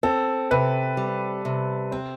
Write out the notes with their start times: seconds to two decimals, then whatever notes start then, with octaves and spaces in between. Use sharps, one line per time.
0.03 C4 A4
0.51 C3 B4
0.97 G3
1.45 C3
1.91 C4 C5